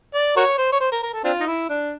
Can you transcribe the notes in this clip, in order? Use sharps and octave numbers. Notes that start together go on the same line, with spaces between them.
D5
F#4 A#4 C#5
C5
C#5
C5
A#4
A#4
A4
C4 D4 F4
D#4
E4
D4